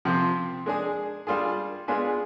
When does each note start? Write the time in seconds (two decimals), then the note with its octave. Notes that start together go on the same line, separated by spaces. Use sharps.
0.05 C3 F3 C4
0.66 G#3 D4 G#4
1.27 G3 D4 F4 G#4
1.88 G#3 B3 D4 F4 G#4